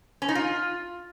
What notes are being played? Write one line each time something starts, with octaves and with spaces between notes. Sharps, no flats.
C#4
D#4
F4